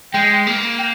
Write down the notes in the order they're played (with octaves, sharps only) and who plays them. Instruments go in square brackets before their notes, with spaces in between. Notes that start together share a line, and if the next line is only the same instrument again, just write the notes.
[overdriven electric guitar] G#3 [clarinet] G5
[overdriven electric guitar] A#3
[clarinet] G5